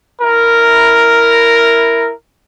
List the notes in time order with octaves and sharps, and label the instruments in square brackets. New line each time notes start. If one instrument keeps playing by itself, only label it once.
[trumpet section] E4 A#4